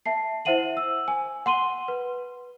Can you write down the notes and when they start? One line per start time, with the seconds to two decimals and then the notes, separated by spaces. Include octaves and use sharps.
0.06 E5 A5 C7
0.45 E4 C5 E5 F#5 D#7 F#7
0.77 E6
1.08 G#5
1.46 F#5 C6 D#7 G7
1.88 B4